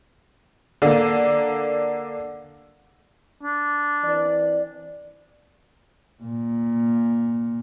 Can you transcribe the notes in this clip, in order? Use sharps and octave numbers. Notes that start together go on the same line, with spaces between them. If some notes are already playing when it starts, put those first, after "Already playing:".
D3 A#3
D4
E3 C4 D5
A#2